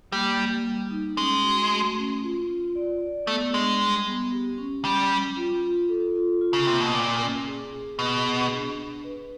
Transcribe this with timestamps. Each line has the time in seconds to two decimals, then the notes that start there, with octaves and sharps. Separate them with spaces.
0.12 G3 A#3
0.39 A#3
0.65 G3
0.91 D#4
1.17 G#3 C#4
1.44 F#4
1.70 A3
1.96 C#4
2.22 F4
2.49 F4
2.75 D5
3.01 D5
3.27 A3 B3
3.53 G#3 D4
3.80 G3
4.05 B3
4.32 G4
4.58 C#4
4.85 G3 C#4
5.11 C#4
5.36 F4
5.63 F4
5.89 A4
6.16 F4
6.41 F4
6.53 C#3
6.66 C3 A#3
6.81 B2
6.94 A#2 A#3
7.21 C#4
7.47 G#4
7.72 G#4
7.99 B2 G#4
8.26 G#4
8.51 D4
8.78 D4
9.04 B4